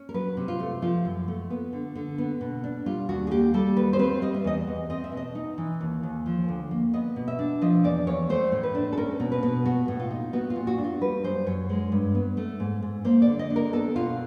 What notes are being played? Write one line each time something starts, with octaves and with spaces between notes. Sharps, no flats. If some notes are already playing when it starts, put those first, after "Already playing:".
Already playing: C#4
A#4
F#3 B4
C3
F4
A3
F3 F4
F#2
A3
B3
D3
D3
B3
B2
D4
G3 F4
D#2 F#4
G#4
A#3 G4
G3 A4
D#2 B4
C5
C4 B4
G3 D#5
E5
E2 D#5
E2
C4 D#5
E5
B2
D#5
D#4
E3
D#2
D#2
F3
D2
A#3
B3 D#5
B2
E5
D4
F3 D#5
E2 D5
E2 C#5
A3 C5
A2
B4
D4
A4
C#4 A#4
B2
B4
B2
B3 F#4
A2
F4
D#4
B3 F#4
F4
A#2
F#4
D4
F4
G3 B4
F#2 C5
F#2 C#5
G#3
G2
B3
A3
G#2
G#2
A#3 C5
D5
D3
D#5
D4
A#4
B3 A4
B2 F4